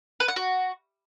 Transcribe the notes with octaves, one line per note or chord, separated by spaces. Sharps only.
B4
F#5
F#4